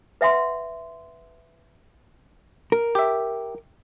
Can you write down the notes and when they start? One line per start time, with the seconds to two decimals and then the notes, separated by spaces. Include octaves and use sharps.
0.21 B4 E5 F#5 C6
2.72 A#4
2.95 G4 E5